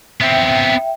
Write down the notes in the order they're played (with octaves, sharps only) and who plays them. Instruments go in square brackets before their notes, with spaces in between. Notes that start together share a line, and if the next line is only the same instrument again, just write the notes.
[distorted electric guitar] B3 C4 [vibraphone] E5 G5